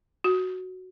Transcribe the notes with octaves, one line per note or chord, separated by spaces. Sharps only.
F#4